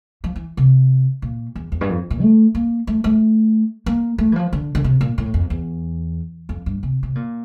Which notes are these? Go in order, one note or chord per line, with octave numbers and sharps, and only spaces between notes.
F3
E3
C3
A#2
E2
E2
G2
F2
A#2
A3
A#3
A3
A3
A#3
A3
E3
F3
D3
D3
C3
A#2
A2
F2
E2
F2
G2
C3
C3
A#2